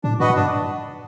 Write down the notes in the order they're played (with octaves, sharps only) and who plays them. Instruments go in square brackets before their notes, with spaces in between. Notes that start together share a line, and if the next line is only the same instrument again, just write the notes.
[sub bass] A2 [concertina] D4
[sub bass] G#2 [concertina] F#4 B4 D#5 F#5
[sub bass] G#2
[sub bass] G2 [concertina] D4